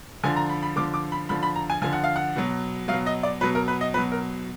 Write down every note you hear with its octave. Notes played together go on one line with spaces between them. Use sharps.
D3 F3 G#5
A#5
B5
B5
D3 F3 D6
D6
B5
D3 F3 B5
B5
A#5
G#5
D3 F3 G#5
F#5
F5
F#5
B2 F#3
B2 F#3 F5
D#5
D5
B2 F#3 B4
A#4
B4
D#5
B2 F#3 B4
A#4